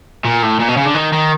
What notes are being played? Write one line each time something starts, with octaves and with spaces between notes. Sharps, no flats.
A#2
A2
A#2
B2
C#3
D3
D#3
D#3